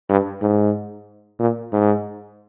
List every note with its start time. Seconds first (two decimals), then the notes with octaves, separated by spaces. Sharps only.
0.09 G2
0.42 G#2
1.39 A#2
1.72 G#2